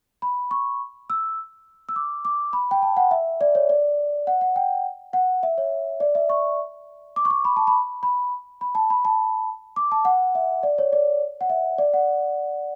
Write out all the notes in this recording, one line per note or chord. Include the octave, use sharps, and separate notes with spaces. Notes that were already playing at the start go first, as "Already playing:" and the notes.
B5
C#6
E6
E6
D6
D6
B5
G5
A5
F#5
E5
D5
C#5
D5
F#5
F#5
G5
F#5
E5
C#5
D5
E5
C#6
D6
C#6
D6
B5
A5
B5
B5
B5
A5
B5
A5
D6
A5
F#5
E5
D5
C#5
D5
F#5
E5
D5
F#5